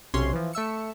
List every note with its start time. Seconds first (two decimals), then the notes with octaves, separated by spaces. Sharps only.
0.14 B1 C3 C#4 C#5 C6
0.33 E3 F3
0.53 A3 E5 E6 C#7